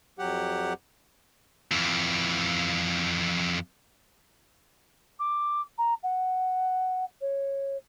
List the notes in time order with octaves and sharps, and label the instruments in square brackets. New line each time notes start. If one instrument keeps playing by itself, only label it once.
[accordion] F2 F#3 G4 F#5
[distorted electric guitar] F2 E3
[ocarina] D6
A#5
F#5
C#5